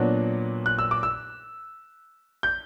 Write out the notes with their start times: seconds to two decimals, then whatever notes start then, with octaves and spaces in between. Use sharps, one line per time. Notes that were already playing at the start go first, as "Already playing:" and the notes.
Already playing: A#2 F#3 B3 D4
0.66 F#6
0.79 E6
0.91 D6
1.03 E6
2.43 G6